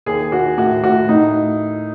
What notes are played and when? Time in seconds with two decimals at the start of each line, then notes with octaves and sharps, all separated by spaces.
0.06 D#2 G#4
0.32 D#2 F#4
0.58 A2 F#4
0.83 A2 F#4
1.09 A2 D#4